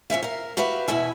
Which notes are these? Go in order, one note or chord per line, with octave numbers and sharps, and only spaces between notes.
F2 C#4 E5 F5
A#4 F5
F#4 G4 B4 E5 F5
E2 B2 E4 E5 G#5